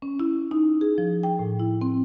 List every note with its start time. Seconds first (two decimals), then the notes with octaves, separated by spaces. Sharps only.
0.02 C#4
0.20 E4
0.51 D#4
0.81 G#4
0.98 F3
1.23 G5
1.39 A2
1.60 E4
1.81 C4